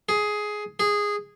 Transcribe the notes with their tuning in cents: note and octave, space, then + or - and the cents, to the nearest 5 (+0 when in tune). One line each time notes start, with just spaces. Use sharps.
G#4 +10
G#4 -10